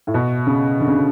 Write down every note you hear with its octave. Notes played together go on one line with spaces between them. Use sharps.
A2
B2
C#3
D3
C#3
D3